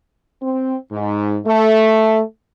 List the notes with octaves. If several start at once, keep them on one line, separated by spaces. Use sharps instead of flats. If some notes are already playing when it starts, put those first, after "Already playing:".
C4
G#2
A3